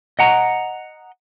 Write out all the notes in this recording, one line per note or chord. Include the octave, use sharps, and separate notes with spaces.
D#5 F#5 A#5